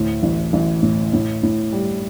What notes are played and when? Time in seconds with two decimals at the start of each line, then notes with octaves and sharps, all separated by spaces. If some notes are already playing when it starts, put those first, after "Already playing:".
Already playing: D2 A2
0.23 A1
0.53 A1
0.83 A2
1.13 A2
1.43 A2
1.73 G3